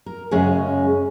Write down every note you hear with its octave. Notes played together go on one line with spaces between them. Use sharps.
A#4
F#2 C#3 G#3 C#4 G#4 F#5